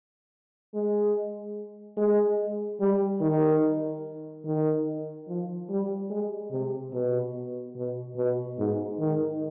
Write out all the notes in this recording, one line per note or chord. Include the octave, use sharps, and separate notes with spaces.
G#3
G#3
G3
D#3
D#3
F3
G3
G#3
C3
B2
B2
B2
G#2
D#3